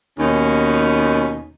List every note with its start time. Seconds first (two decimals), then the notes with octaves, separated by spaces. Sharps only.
0.18 D#2 B2 C#4 D#4